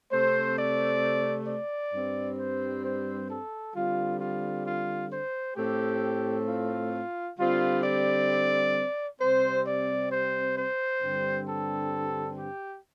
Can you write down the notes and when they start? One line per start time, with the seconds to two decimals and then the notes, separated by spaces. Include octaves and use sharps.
0.12 C3 A3 C4 C5
0.57 D5
1.48 D5
1.94 G2 G3 C4
2.39 C5
2.85 C5
3.29 A4
3.75 D3 G3 C4 F4
4.20 F4
4.66 F4
5.12 C5
5.57 A2 A3 C4 G4
6.48 F4
7.39 D3 G3 C4 F4
7.84 D5
9.20 C3 G3 C4 C5
9.66 D5
10.12 C5
10.57 C5
11.02 G2 D3 G3 C4
11.48 A4
12.38 G4